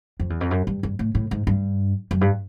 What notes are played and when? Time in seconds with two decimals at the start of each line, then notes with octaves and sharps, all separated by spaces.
0.20 F2
0.30 E2
0.41 F2
0.51 F#2
0.67 G2
0.83 G2
0.99 A2
1.15 A2
1.31 G#2
1.47 G2
2.11 F#2
2.21 G2